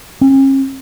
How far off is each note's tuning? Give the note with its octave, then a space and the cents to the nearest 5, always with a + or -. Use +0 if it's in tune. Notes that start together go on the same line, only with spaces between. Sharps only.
C#4 -40